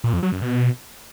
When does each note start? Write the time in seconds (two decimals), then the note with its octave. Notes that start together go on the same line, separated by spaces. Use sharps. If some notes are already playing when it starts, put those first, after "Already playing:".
0.04 A#2
0.13 F2
0.23 F#3
0.32 F#2
0.42 B2